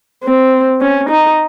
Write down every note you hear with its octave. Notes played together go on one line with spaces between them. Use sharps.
C4
C#4
D#4